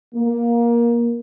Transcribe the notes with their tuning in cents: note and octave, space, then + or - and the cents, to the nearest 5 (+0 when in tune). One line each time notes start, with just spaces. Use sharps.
A#3 +15